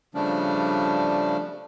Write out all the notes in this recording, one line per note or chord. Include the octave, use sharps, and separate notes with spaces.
C#3 F3 G3 A3 D4